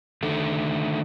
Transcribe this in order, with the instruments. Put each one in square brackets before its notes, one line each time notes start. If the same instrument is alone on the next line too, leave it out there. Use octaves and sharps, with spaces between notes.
[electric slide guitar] D3 D#3 A3